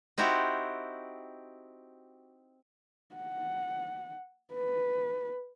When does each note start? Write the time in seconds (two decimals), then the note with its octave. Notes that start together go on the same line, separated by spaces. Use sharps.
0.18 C4 D#4 E4 F#4 G4
3.15 F#5
4.54 B4